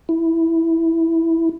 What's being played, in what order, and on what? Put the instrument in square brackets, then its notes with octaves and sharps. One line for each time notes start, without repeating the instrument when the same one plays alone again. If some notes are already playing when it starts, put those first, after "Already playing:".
[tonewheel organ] E4